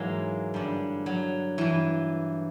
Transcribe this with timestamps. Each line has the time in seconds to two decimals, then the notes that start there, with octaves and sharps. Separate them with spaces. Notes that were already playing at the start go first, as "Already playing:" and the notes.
Already playing: G#2 E3 F#3 G#3 A#3
0.54 G2 D3
1.06 F#3
1.58 G2 E3